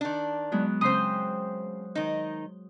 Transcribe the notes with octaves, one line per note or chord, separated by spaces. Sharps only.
D#3 D4
F#3 G#3 B3
C#3 C4 C5 C6 D#6
D#3 D#4